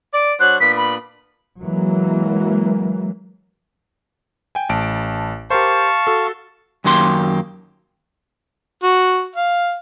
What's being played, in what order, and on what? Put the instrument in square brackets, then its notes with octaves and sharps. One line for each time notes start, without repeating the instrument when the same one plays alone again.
[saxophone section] D5
[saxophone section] F#3 D4 C5 [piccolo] F#6
[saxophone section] A#2 B3 D4 [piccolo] B6
[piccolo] B5
[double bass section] E3 F#3 G#3 A#3
[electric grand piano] G5 G#5
A1 A5 D7
[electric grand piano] G4 A#4 C5 [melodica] F5 A5 C#6
[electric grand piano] F#4 A4
[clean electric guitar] F#2 D#3 F#3 A#3 G4 C6
[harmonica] F#4
F5